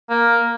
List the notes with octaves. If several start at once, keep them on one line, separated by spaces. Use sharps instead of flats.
A#3